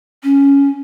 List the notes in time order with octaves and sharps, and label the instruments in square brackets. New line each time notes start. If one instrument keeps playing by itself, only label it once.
[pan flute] C#4